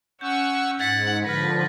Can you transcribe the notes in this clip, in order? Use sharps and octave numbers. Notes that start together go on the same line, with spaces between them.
C#4 F#5 C#6 E6 G6
G#2 F#5 G#6 A6 B6
D3 F3 B4 F6 A#6